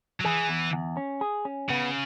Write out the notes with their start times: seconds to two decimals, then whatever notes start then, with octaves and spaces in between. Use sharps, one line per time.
0.20 F#3
0.24 E3 G#4
0.49 E2
0.73 E2
0.97 C#4
1.21 G#4
1.45 C#4
1.69 C#3 B3